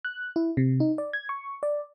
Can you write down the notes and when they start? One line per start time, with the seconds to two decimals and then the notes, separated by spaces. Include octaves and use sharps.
0.05 F#6
0.36 E4
0.57 C3
0.80 D#4
0.98 D5
1.13 G#6
1.29 C#6
1.63 D5